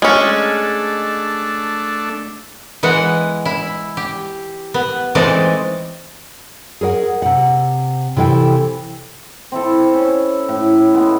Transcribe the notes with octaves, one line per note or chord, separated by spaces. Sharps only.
G#3 A3 C#4 D4
E3 G#3 B3 F#5
E4
G4
B3
E3 G#3 A3 C4 D#4 D5
G#4 A#4 C#5 F#5
C3 F#5
C3 E3 A4 F5 G5
C4 E4 A4
C#4
A2
G#3 B3